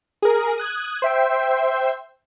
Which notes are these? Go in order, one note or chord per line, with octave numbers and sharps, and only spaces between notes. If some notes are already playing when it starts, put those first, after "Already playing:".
G#4 A#4
D#6 F#6 G#6
C5 E5 G5